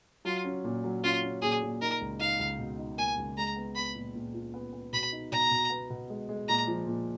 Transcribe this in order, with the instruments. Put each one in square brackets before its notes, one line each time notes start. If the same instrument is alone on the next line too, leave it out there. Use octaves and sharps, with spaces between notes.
[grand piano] F#3 [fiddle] F4
[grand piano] C#4
A#2
F#3
[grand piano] C#4 [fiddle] F4
[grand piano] C#4
[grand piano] A#2 [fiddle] G#4
[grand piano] A#2
[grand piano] D#4 [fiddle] A#4
[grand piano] C#2
[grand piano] D#4 [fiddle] F5
[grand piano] C#2
B2
D#4
[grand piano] A#3 [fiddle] G#5
[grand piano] C#2
[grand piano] G#3 [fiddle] A#5
[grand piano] B3
[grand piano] B3 [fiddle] B5
[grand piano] A#2
A#2
F4
B3
B3
[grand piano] B2 [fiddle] B5
[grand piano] D#4
[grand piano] B2 [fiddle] A#5
[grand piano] B2
B3
B2
G#3
G#3
[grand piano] A#2 [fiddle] A#5
[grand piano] F3
A#2